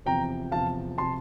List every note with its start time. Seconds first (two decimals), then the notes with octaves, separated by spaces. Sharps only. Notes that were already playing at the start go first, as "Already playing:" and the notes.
0.06 E2 C3 F3 G5 A#5
0.52 E2 C3 F3 F5 A5
0.98 C3 F3 A5 C6